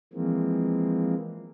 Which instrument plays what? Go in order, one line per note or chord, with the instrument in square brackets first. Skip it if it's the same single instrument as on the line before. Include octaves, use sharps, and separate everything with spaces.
[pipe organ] E3 F3 G#3 A#3 C4